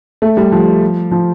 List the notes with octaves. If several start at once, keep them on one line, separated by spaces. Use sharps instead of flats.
A3
G3
F3
F3